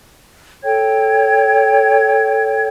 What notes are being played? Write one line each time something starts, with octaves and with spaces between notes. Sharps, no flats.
A4 C#5 G5 G#6